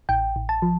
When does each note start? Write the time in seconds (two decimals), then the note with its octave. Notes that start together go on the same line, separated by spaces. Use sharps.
0.09 A1 G5
0.36 A1
0.49 A5
0.62 F3